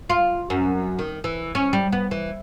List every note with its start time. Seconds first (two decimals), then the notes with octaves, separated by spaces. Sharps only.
0.10 F4
0.50 F#2
0.99 D#3
1.24 E3
1.55 C#4
1.73 G3
1.92 B3
2.11 E3